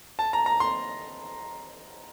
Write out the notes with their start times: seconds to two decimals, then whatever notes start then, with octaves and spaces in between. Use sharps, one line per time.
0.19 A5
0.33 A#5
0.46 A#5
0.60 C6